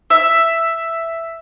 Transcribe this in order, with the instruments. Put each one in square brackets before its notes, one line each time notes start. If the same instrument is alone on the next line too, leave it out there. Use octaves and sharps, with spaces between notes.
[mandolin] E5